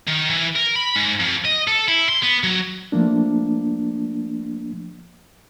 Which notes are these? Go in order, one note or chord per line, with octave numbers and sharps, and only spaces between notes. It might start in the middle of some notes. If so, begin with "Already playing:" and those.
D#3
E3
A#4
B5
G#2
F2
D#5
A4
E4
C6
B3
F#3
F3 A3 A#3 D4